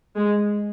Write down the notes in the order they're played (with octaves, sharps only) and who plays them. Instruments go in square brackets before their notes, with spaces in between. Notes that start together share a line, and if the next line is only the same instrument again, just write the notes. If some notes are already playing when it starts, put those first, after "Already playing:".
[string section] G#3